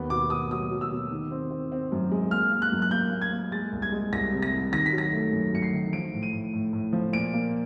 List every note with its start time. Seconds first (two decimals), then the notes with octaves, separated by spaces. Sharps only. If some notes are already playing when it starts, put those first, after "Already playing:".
Already playing: D#2 B3
0.10 B2 D6
0.30 B2 D#6
0.51 F#3 D#6
0.71 F#3
0.81 E6
0.91 B2
1.11 D#3
1.31 C4
1.51 C4
1.72 C4
1.92 F#2
2.11 G#3
2.31 A#3 F6
2.52 A#3
2.62 F#6
2.72 F#2
2.82 F#6
2.91 A#3 G6
3.12 A#3
3.21 G#6
3.32 A#3
3.52 G#3 A6
3.72 C2
3.82 G#6
3.92 G#3
4.12 C2 A#6
4.32 C3
4.42 A#6
4.52 C2
4.72 D#3 A#6
4.86 B6
4.92 F#3
4.98 A#6
5.12 A3
5.32 F#2
5.53 F#2 C#7
5.63 C7
5.73 D#3
5.93 F3 D7
6.13 A2
6.23 D#7
6.33 A2
6.53 A2
6.73 A2
6.93 F3
7.13 A#2 D7
7.33 A#3